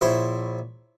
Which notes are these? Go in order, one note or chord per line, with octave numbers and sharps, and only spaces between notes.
A#1 E4 C5 C#5